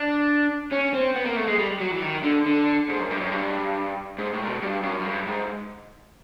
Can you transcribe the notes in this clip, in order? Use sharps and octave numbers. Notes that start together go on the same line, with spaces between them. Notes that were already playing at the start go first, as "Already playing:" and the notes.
Already playing: D4
C#4
C4
B3
A#3
A3
G#3
G3
F#3
E3
D#3
D3
D3
G#2
F#2
G2
F#2
G2
G#2
A2
A#2
B2
G2
F#2
F#2
G2
G#2